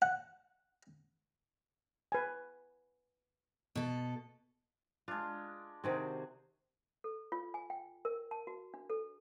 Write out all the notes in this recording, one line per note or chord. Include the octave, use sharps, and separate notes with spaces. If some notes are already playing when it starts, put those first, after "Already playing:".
F#5
B4 G#5
B2 A4
G#3 D4 F4
C3 D#3 C4 F#4 G#4 C5
A4
F4
G#5
G5
A#4
A5
F#4
D4
A4